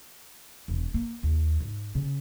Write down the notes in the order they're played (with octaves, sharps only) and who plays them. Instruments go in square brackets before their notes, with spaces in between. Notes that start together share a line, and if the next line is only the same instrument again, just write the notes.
[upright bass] E1
A#3
D#2
G#2
C#3